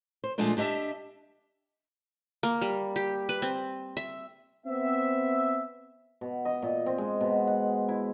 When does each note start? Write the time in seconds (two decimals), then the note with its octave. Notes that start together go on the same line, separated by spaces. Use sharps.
0.24 C5
0.38 A#2 F3 G#3 A3 D4 F4
0.57 D4 G4 D#5 E5 A5
2.43 A#3
2.62 G3
2.96 G4
3.29 B4
3.42 C4
3.97 E5
4.67 B3 C4 E5
6.21 B2
6.45 D#5
6.62 A#2
6.86 C4
6.98 G#3
7.21 B2
7.47 F#5
7.88 E4